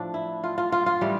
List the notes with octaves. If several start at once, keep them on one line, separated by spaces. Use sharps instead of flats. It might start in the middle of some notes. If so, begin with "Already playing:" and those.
Already playing: A2 F3 D4
E4
F4
F4
F4
F4
A2 E3 G3